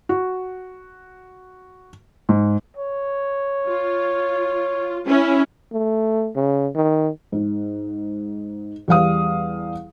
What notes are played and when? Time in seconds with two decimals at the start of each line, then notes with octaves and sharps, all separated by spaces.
0.09 F#4
2.29 G#2
2.77 C#5
3.66 F4
5.05 C#4 E4
5.73 A3
6.36 C#3
6.75 D#3
7.32 G#2
8.88 E2 G3 F5 D#6